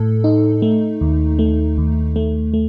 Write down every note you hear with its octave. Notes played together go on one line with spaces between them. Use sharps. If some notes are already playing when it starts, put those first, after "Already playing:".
Already playing: A2 A4
D#4
A3
D#2
A3
D#2
A3
A3